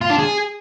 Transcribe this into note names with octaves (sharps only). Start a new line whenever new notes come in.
F4
D4
G#4